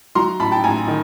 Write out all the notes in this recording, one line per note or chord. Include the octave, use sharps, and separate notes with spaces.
F#3 A#5 C6
A1 A5 B5
G5 A5
A1 G#5 A#5
D#3